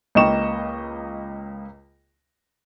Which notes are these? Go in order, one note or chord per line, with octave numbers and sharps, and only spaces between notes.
C#2 A#3 D#5 G5 C#6 E7